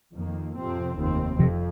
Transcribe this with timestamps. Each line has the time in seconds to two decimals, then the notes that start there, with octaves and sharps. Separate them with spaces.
0.15 F2 D#3 A#3
0.57 F2 C3 F3 C4
0.98 F1 D#2 D#3 C4
1.39 F2 C3 F3